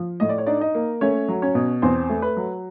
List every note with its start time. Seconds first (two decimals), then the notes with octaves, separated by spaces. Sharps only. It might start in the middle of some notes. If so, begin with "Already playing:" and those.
Already playing: F3
0.20 A2 D#5
0.29 D5
0.38 C#5
0.46 D4 D#4 D5
0.60 D#4 D#5
0.75 A#3
1.01 A3 C#4 C#5
1.28 F#3
1.42 C#4 C#5
1.55 B2
1.82 E2 C4 C5
2.09 A3
2.22 B4
2.37 F#3